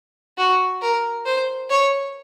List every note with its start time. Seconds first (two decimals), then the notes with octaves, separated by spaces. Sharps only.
0.38 F#4
0.82 A#4
1.26 C5
1.70 C#5